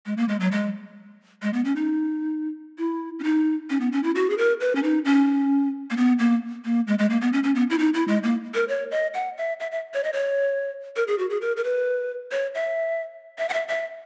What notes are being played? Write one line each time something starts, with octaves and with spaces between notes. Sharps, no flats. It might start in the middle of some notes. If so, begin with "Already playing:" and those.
G#3
A#3
G#3
F#3
G#3
G#3
B3
C#4
D#4
E4
C#4
D#4
C#4
B3
C#4
E4
F#4
G#4
A#4
B4
C#4
D#4
C#4
A#3
B3
A#3
A#3
G#3
G#3
A#3
B3
C#4
C#4
B3
E4
D#4
E4
G#3
A#3
A#4
C#5
D#5
F#5
E5
E5
E5
C#5
D#5
C#5
A#4
G#4
F#4
G#4
A#4
A#4
B4
C#5
E5
E5
F#5
E5
E5